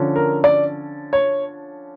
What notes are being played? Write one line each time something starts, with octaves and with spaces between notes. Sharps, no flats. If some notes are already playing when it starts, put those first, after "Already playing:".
Already playing: D3 F3 C#4
A#4
D5
C#5